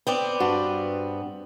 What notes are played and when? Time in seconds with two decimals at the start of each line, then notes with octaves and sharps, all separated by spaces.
0.07 B3 C4 D5 G5
0.40 G2 F#4